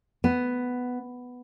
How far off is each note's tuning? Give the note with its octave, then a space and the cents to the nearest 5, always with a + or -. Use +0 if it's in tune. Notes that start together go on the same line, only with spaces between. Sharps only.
B3 +5